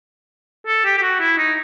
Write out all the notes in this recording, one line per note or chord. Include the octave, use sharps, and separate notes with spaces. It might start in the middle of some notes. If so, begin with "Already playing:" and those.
A4
G4
G4
F#4
E4
D#4